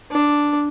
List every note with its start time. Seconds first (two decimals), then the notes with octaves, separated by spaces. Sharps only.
0.11 D4